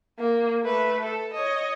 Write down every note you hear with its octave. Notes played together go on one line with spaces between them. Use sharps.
A#3
A3 B4
A4
C#5 D#5